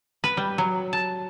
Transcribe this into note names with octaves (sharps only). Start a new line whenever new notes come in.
B4
G3
F#3
A5